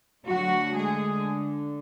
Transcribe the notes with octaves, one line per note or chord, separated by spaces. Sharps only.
D3 F#3 A3 F#4
G#3 G#4